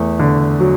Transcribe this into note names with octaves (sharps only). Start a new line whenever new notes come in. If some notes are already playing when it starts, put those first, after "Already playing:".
Already playing: E2 A3
D3
F#3